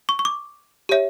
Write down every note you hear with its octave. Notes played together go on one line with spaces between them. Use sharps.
C#6
C#6
D6
G4 C#5 E5